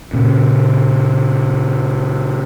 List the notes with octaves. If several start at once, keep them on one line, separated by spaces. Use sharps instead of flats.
A#2 C#3